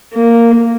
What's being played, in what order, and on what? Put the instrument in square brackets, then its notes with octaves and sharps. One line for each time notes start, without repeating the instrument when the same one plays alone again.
[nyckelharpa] A#3